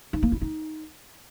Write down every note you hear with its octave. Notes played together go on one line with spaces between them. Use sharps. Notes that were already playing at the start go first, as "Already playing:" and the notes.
D#4
A#3
E4
D#4